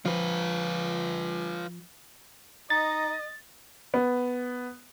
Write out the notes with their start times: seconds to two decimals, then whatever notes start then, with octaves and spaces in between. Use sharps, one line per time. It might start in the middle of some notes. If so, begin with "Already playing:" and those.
0.06 F3 F4 B4
2.70 D#4 D#5 A6
3.94 B3